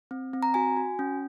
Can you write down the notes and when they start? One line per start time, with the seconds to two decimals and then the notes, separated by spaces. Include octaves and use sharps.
0.11 C4
0.33 C4
0.43 A#5
0.54 F#4 G#5
0.77 F#4
0.99 C#4